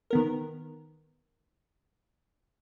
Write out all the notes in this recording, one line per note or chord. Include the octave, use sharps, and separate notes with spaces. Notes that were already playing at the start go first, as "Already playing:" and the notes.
D#3 B3 A#4